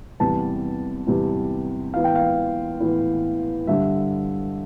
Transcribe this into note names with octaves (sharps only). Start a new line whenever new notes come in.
E2 C3 G3 B3 A5
E2 C3 G3 B3
A2 E3 B3 F5
G5
F5
A2 E3 B3
G2 D3 G3 E5